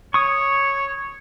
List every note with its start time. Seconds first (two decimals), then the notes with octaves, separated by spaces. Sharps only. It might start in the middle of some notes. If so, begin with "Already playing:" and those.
0.14 C#5 C#6 D#6